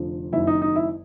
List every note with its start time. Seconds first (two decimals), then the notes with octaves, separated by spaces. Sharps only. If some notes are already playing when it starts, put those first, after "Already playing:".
Already playing: F1 F2 D3 F3
0.33 F#1 F#2 D#3 E4
0.47 D#4
0.62 D#4
0.76 E4